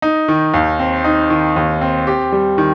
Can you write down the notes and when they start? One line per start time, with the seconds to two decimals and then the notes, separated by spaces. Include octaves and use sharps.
0.02 D#4
0.28 D#3
0.54 D#2
0.79 C4
1.04 D#4
1.30 D#3
1.56 D#2
1.81 C4
2.07 G4
2.32 G3
2.58 D#3